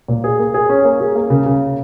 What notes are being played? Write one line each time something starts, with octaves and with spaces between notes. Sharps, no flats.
A#2
G#4
A#3
G#4
C#4
A#3
G#4
A#3
C#3
C#3